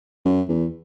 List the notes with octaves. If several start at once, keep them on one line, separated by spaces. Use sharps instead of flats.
F#2
E2